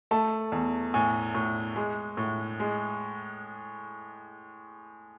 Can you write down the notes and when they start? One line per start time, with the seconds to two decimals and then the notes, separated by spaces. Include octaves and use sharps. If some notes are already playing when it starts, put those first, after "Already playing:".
0.11 A3 A5
0.52 E2
0.94 A2 G#5
1.35 A2
1.76 G#3
2.17 A2
2.60 G#3